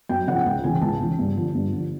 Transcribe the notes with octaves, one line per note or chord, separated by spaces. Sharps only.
F#2 G5
C#3 F3 F#5
C#2 G5
C#3 E3 G#5
C#2 A5
C#3 E3
G2
D3 F3
G2
D3 F3